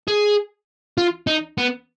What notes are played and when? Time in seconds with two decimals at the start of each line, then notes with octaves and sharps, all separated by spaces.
0.08 G#4
0.98 F4
1.27 D#4
1.58 B3